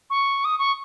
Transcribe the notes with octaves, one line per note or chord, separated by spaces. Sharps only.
C#6
D#6
C#6